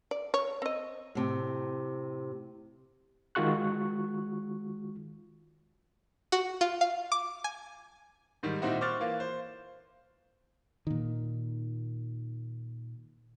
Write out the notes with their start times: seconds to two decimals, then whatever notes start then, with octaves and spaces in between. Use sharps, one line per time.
0.11 D5
0.34 C#5
0.62 C4 D#5
1.15 A2 C3
3.35 D#3 G#3 F4 F#4 C#6 F#6
6.32 F#4
6.61 F4
6.81 F5
7.12 D6
7.44 G#5
8.43 G#2 D#3 G3
8.62 A#2 C4 D#4 E4 F#4
8.81 C5 C#6 D6 F6 F#6 A6
9.00 E3 A#3 F4
9.20 C5
10.87 A#2 D#3